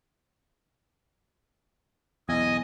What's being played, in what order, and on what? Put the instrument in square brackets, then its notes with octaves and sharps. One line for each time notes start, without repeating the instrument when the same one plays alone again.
[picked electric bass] B1 E2 [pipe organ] D#5 G#5